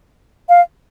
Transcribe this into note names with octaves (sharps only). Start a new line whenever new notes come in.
F5